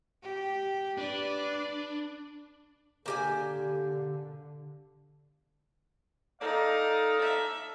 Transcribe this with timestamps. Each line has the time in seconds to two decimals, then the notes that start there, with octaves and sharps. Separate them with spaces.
0.23 G4
0.98 D4 B4 D5
3.06 D3 A#3 G4 G#5
6.41 D#4 A4 D5 F5
7.21 E5